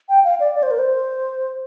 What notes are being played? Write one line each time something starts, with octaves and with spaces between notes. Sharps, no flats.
G5
F5
D5
D5
C5
A#4
C5